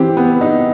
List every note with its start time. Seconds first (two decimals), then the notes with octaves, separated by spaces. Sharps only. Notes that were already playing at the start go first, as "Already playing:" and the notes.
Already playing: E3 C4 G4
0.17 B3
0.41 D#4